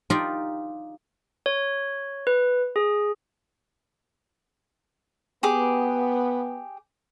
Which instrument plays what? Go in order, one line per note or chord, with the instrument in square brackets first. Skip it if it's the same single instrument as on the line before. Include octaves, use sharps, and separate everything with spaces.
[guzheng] D#4 F4 G4 A#4 D5
[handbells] C#5
B4
G#4
[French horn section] B3 [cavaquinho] G4 G#4 D6